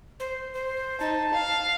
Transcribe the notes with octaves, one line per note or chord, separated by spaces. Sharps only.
C5
C5
D#4 A5
F5